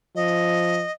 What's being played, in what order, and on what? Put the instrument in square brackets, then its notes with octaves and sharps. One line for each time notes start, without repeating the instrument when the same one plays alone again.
[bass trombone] F3 [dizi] D#5